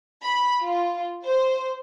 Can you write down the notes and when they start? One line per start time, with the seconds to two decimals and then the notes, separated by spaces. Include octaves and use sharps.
0.23 B5
0.61 F4
1.24 C5